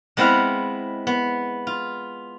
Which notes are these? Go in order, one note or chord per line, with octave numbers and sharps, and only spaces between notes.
G#3 B3 C4 E4 B4 F5
B3
F4